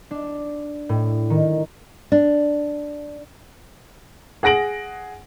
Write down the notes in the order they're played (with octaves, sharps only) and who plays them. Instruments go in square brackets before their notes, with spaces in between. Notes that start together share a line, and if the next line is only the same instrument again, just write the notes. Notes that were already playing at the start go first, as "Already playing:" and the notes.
[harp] D4
A2
D#3
[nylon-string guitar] D4
[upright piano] G#4 F#5 A#6 D7 F#7